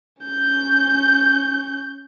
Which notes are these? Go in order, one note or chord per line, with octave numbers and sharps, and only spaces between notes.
C#4 G6